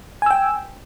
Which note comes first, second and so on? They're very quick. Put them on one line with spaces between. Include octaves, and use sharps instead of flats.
G#5 E6 G5